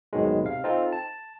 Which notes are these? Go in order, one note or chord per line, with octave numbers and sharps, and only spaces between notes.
D2 G#2 B2 D#3 F#3 G#3
C3 F5
C4 D#4 F4 A4
A5